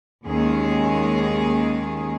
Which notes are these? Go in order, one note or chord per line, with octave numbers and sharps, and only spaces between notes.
D#2 D#3 G#3 C#4 G#4